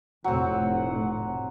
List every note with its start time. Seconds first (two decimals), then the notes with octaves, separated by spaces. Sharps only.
0.24 F1 A2 F#3 C4 F#5